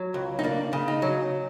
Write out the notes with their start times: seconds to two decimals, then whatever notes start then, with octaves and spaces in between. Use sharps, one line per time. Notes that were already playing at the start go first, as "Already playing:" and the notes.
Already playing: F#3
0.14 C#2
0.39 D#4
0.43 A#3 D4
0.73 C#3
0.88 D#4
1.02 F#3